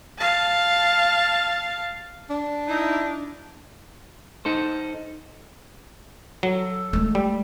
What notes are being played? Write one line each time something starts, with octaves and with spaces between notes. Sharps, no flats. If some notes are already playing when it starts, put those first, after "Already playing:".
F5 A5
D4
D#4 E4
D#4 A4 C5
F#3 A4
G#3 A3
G3